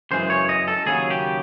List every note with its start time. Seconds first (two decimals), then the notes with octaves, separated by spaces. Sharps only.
0.11 F#2 C#3 E3 G#3 C5
0.30 C#5
0.49 D#5
0.68 A4
0.86 D#2 C#3 F#3 G#4
1.10 G4